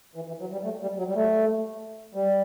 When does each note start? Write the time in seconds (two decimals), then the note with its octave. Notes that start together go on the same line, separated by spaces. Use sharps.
0.16 E3
0.28 E3
0.40 F#3
0.53 G3
0.64 A3
0.82 G3
0.99 F#3
1.08 G3
1.16 A3
2.15 G3